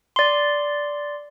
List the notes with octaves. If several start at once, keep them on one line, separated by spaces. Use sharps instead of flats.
D5 C6